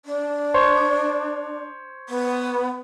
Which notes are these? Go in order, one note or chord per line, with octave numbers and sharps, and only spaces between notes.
D4
C5 C#5 C6
B3